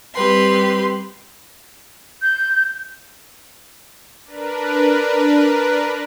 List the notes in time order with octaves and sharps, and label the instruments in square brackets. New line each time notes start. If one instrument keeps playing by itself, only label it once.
[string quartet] G3 C4 G4 B4 C6
[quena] G6
[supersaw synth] D4 A#4 B4